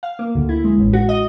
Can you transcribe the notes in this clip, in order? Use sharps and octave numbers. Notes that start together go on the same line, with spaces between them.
F5
A#3
D2
E4
G#3
A1
F#4
D#5